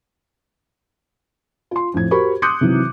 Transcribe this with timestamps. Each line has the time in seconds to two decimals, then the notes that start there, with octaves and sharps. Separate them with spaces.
1.71 F4 C6
1.94 F2 A2 G#6
2.11 F#4 G4 A#4 C5 B5 C#6
2.42 C6 D6 D#6 F#6 G6 C#7
2.61 C3 D#3 E3 F#3